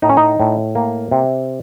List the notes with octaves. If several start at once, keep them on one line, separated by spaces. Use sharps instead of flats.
A2 D#4
C#4
D#4
A2
A#3
C3